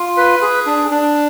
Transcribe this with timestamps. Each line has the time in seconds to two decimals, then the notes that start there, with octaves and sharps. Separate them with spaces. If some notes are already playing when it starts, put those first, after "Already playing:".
Already playing: F4
0.17 B4
0.42 G#4
0.66 D4
0.91 D4